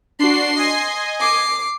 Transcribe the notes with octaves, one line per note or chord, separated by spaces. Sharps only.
D4 F#4 C6 C7
D#5 G#5
D6 C7